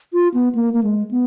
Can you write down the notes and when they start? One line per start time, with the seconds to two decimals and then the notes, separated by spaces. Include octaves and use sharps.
0.13 F4
0.34 B3
0.55 A#3
0.74 A#3
0.83 G#3
1.11 B3